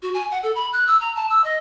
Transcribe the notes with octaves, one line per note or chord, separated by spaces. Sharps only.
F#4
G#5
F#5
A4
B5
F#6
E6
A#5
A5
E6
D#5